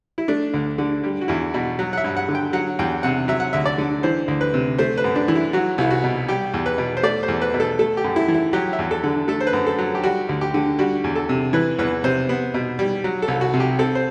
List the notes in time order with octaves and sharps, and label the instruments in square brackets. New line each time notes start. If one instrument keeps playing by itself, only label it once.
[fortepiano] E4
A3 D4
D2
D3
G3
F#4
E2 E4
B2 F#4
F#3
F#5
E5
G2
F#5
D3
G5
F#3 F#5
E2 G5
C3 F#5
F#3 E5
F#5
D2 E5
D5
D3
E3 C5
D2
B4
C3
A3 C5
B4
F#2
D4
E3
E4
F#3 F#4
C2 E4
F#4
B2
G3 G4
E2
B4
B2
C5
A3 D5
C5
E2
B4
B2
A4
A3 A4
G4
F#2
E4
E3
E4
F#3 G4
E5
E2
A4
D3
A3 A4
C5
B4
F#2
A4
F#3
G4
G3 F#4
D2
G4
D3
G3 F#4
E2
A4
C3
E3 B4
E2 B4
C3 C5
B3
B2
G3
F#3
A4
C2
F#4
C3
G4
C4 A4
C5